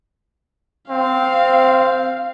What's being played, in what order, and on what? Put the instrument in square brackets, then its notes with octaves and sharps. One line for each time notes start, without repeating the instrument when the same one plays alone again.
[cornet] C4 [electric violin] F5